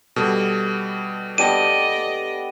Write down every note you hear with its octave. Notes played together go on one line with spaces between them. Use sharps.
B2 G3 A4
B3 D4 G4 D5 D#5 D#7